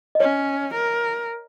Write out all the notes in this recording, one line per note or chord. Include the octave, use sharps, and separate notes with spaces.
D#5
C#4 C#5
A#4